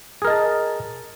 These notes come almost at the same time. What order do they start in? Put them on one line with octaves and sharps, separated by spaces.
G#4 A#4 D#5 A5